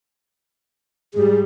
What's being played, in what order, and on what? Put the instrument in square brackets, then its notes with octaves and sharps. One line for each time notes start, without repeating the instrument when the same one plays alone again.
[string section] G#2 G3 [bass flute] G#4